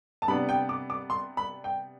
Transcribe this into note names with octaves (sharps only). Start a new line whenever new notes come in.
A5
C3 G3 B3 D4 B5
G5
D6
D6
C6
B5
G5